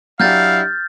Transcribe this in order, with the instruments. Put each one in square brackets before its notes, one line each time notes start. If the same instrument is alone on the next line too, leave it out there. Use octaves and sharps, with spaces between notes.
[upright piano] F#3 D4 G4 [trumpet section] E4 F5 [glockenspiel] F6 G6 A6